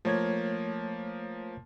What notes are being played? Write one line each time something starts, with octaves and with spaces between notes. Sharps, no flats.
F3 A3 A#3 C#5 G#6